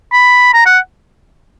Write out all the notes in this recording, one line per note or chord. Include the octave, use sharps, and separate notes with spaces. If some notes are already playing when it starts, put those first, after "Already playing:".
B5
A#5
F#5